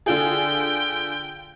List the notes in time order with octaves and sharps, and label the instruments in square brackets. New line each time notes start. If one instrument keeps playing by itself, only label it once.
[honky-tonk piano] D3 F4 G#4 [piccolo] G5